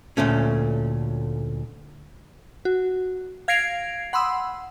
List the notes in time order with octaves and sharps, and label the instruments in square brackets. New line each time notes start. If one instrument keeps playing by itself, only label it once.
[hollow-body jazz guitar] D2 A#2 A3 C#4
[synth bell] F#4
F5 G#6 A#6 C7 D7 F7
F#5 B5 C6 D#6 E6